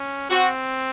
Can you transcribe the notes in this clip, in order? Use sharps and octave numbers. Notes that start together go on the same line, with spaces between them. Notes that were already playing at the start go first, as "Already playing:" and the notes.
Already playing: C#4
C4 F#4